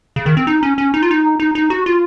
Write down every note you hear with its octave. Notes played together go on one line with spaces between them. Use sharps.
C#3
D#3
C4
D#4
C#4
C#4
D#4
F4
D#4
D#4
D#4
F#4
F4